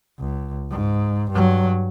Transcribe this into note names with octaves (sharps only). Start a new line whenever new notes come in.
C#2
G#2
G2 F#3